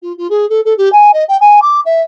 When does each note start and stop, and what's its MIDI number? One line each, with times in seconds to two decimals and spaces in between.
0.02 0.12 65
0.17 0.27 65
0.30 0.48 68
0.49 0.60 69
0.65 0.76 69
0.77 0.91 67
0.92 1.11 80
1.13 1.23 75
1.28 1.37 79
1.40 1.59 80
1.61 1.80 86
1.85 2.01 76